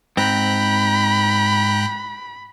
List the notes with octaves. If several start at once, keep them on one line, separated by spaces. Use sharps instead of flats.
G#2 C4 G5 A#5 B5 F#6